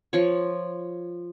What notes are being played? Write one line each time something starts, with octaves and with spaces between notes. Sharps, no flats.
F3 C#5